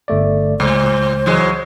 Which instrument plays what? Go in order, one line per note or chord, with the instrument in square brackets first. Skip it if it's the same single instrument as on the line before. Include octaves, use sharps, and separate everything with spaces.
[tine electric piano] G1 A3 D5
[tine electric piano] C#2 [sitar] A2 [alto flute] C5
[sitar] E3 F#3 G#3